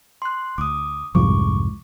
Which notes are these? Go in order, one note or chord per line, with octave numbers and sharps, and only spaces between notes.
C6 F#6
D2 D6 D#6
C2 F2 G#2 F3 G3 C#6 D6